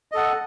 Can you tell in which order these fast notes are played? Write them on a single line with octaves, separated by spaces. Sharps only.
D#5 A4 F#5